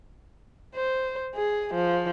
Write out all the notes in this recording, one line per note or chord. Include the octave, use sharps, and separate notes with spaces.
C5
G#4
F3